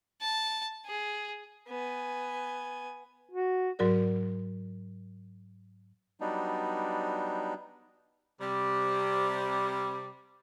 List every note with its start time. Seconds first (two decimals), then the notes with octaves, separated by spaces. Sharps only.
0.22 A5
0.86 G#4
1.68 B3 G#5
3.32 F#4
3.79 G#2 F#3 F#4 A#4 D5
6.21 F#3 G3 B3 D4 D#4
8.41 C3 G3